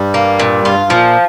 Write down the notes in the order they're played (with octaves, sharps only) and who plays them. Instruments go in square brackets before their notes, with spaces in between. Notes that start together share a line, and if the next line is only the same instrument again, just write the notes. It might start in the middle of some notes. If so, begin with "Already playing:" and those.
Already playing: [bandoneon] G2 G3
[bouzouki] A#3
A#2
[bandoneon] G2 [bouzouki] F4
[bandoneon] A#2 [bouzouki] F3